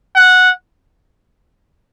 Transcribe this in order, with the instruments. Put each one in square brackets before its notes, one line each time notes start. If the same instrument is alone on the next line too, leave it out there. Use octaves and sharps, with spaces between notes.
[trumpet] F#5